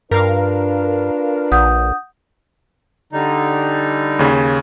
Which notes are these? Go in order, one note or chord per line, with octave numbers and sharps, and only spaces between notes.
G2 D4 F4 A#4 B4 F5
A#1 F#5 D#6 G6
D3 G3 D#4
D#2 C#3